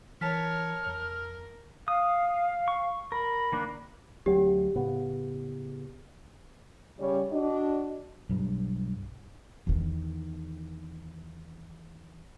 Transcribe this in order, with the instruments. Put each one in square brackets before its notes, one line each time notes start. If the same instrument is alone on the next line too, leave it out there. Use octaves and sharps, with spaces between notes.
[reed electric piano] E3 [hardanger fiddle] A#4 C#5 [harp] A5 B6 [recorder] F6
[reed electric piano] F2 [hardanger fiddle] A#4
[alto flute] F5 [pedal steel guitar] D#6
[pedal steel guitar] C#6
[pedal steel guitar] A#4 [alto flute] B5
[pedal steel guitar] D#3 A#3 D4
[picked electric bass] D2 F#3 C4 [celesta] G4
[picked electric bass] A2 C#3 B3
[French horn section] C#3 G3 C#4 C#5 D5
D4 F#4 D#5
[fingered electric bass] B1 G2
[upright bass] E2 D#3